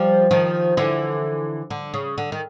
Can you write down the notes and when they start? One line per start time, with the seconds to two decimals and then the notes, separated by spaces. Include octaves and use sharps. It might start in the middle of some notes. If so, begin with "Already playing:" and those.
Already playing: F3 G3
0.31 D#3 F3
0.77 D3 E3
1.70 D3
1.94 C#3
2.18 D3
2.32 D#3